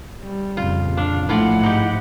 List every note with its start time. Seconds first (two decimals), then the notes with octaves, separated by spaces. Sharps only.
0.22 G3
0.57 F2 A#2 C#3 F4
0.97 D4 F5
1.29 A#1 A2 F3 A3 E4 F4 D5 F#5
1.63 G#2 D#4 G4